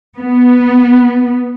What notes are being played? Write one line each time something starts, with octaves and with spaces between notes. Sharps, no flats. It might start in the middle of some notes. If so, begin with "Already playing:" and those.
B3